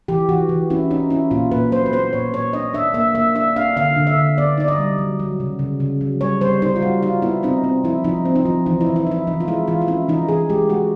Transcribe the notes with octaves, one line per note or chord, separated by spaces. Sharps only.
E3 G4
E3 F#4
E3
C#4 E4
C#4 D#4
C#4 E4
A#2 F4
A#2 B4
F#3 C5
B4
B3 C5
A#2 C#5
A#2 C#5
D4 D#5
D4 E5
A#3 E5
A#3 E5
D4 E5
D4 F5
D3 F5
D3
E5
D3
B3 D5
D#4 D5
D#5
G3
F#3
F#3
C#3
C#3
C#3
F#3
G3 C#5
G3 C5
D#4 C5
F4
G3 F#4
D#4 F4
B3 E4
C4 D#4
C4
F3 E4
F3 D#4
C4
D#4
F3
E3 D#4
E4
E3
E4
D#4 E4
E3 D#4
F4
G#3 E4
E3 F4
F4
C#4 E4
E3 D#4
E3 G#4
G#3 G4
G#3 F#4